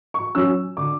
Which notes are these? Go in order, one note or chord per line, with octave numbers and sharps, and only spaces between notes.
C#6
F#3 C#4 E6
D3 D6